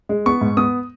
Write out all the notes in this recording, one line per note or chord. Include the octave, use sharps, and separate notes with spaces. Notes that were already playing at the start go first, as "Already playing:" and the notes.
G#3
B3 C#6
G#2
B3 D#6